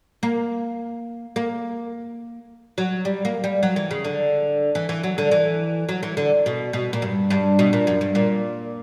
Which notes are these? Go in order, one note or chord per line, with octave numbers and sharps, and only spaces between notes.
A#3
A#3
F#3
G3
A#3
G3
F#3
E3
C#3
D3
E3
E3
F#3
D3
E3
F#3
E3
D3
B2
B2
A#2
G2
G2
B2
A#2
F#2
G2
A#2